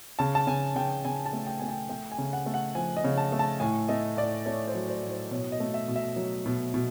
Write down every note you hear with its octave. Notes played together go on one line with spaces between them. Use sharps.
C#3 A5
A5
C#3 G#5
C#3 G5
C#3 G#5
A5
A3
G5
A3 G#5
G5
A3 G5
G#5
C#3
F#5
A3
F#5
F3 G#5
D#5
C#3
A5
A3
A5
A2 G#5
A3 D#5
A2 D5
A3 C#5
C5
F#3
C5
A2
C5
B2 C#5
D#5
A3
E5
B2
E5
F#3
B2
B2